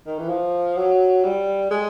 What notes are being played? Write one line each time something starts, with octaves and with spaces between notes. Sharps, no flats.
D#3
E3
F3
F#3
G3
G#3